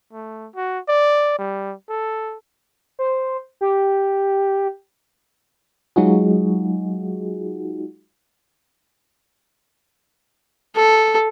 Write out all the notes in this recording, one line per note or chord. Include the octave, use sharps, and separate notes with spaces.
A3
F#4
D5
G3
A4
C5
G4
F#3 G#3 D#4 F4 F#4 G#4
A4